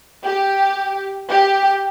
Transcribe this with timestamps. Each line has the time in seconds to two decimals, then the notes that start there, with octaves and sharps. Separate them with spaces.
0.24 G4
1.30 G4